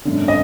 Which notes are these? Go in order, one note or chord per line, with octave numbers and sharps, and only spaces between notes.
G#1 F#2 D3
D#5